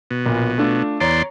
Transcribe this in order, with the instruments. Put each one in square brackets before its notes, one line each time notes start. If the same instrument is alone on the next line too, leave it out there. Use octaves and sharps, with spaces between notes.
[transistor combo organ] B2
[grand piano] A#1 A#2
A3 D4 F4
[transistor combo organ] E2 D5 C6 [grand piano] C#5 A#5